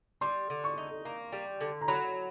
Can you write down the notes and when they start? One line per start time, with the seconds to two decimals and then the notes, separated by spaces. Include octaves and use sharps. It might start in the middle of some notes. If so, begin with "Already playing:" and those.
0.21 G3 C6
0.50 D3
0.64 C#6
0.78 D#4
1.05 A#3
1.33 G3
1.61 D3
1.81 A#5
1.88 F#3 B5